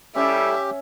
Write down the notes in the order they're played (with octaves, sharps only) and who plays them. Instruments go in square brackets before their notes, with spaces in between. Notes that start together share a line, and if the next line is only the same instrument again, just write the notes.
[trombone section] G3 E4 A4 [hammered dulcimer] C#4 [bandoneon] G4 [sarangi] E5